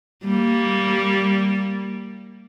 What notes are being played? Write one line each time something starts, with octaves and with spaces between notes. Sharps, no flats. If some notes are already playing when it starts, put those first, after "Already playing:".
G3 A#3